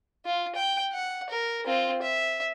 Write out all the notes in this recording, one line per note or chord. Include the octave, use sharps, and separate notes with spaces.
F4
G5
F#5
A#4
C4 F4
E5